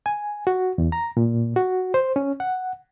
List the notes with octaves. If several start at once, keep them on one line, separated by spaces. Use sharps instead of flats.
G#5
F#4
E2
A#5
A#2
F#4
C5
C#4
F#5